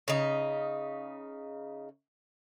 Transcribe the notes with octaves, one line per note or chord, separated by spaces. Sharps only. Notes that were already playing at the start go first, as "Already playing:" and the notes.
C#3 D#4